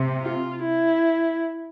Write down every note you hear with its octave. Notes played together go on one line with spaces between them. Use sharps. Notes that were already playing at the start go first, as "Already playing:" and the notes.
Already playing: C3
F4
E4